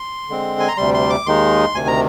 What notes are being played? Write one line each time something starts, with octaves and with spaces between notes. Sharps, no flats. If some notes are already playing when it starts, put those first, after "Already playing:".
Already playing: C6
D3 G#3 C4
G#5
A#5
D2 C3 G3 C6
C6
D6
D#2 D#3 G#3 D#4 C6
D2 C3 D#3 G#5
A#5